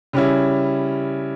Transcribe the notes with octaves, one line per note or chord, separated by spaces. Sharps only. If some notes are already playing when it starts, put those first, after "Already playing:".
C#3 G3 C#4 E4